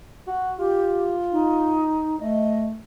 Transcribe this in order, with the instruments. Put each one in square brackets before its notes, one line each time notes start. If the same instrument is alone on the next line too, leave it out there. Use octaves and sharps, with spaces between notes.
[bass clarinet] F#4
[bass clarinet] F4 [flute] G4
[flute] D#4
[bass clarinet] A3 [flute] D#5